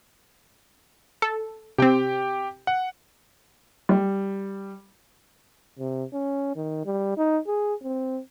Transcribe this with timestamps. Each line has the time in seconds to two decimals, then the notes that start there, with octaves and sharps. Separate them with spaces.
1.22 A4
1.78 C3 C4 G4 G5
2.67 F#5
3.89 G3
5.79 C3
6.13 C#4
6.56 D#3
6.85 G3
7.17 D#4
7.47 G#4
7.83 C4